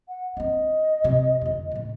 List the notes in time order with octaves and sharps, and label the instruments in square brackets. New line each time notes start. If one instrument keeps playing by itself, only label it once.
[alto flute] F#5
[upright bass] C4 D4 [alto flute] D#5
[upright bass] C3
F2 D3
A2 C#3